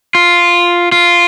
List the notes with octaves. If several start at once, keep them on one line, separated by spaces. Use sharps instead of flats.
F4
F4